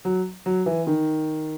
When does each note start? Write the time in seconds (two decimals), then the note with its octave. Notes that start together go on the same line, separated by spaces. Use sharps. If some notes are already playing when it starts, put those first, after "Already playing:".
0.05 F#3
0.46 F#3
0.66 E3
0.87 D#3